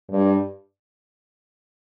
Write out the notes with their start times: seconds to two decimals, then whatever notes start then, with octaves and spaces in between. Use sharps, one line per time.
0.11 G2